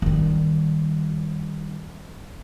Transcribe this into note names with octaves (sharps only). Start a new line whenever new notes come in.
D#3 G3